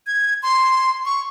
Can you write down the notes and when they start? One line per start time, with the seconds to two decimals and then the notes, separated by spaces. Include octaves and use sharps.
0.07 G#6
0.43 C6
1.05 C#6